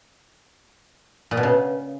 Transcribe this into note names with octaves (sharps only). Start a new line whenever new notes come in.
A#2
B2
C#3